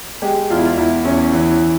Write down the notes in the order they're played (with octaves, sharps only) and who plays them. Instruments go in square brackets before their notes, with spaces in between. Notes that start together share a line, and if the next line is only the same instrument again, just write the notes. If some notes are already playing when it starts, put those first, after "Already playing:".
[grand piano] G#3 G4
E2 F4
E4
F4
E2 E4
E2 C#4
E3